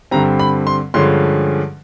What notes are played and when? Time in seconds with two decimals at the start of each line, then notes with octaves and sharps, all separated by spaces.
0.11 G2 D3 G3 C4 A#5
0.39 B5
0.67 C6
0.94 G2 D3 F3 G#3 C#4 C6